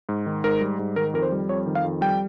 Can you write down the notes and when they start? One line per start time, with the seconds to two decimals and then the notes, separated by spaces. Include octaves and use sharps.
0.09 G#2
0.26 D#3
0.44 G#2 A#4
0.61 G3
0.79 G#2
0.96 D#3 A#4
1.14 F2 A#4
1.22 C5
1.32 G3
1.49 F2 C#5
1.66 D#3
1.75 F5
1.84 F2
2.01 G3 G5